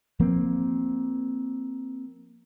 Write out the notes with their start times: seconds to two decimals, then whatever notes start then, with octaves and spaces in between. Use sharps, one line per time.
0.19 F3 A#3 C4